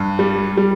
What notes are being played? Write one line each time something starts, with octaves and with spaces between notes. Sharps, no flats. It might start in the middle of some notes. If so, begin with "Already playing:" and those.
Already playing: G2
G3
G3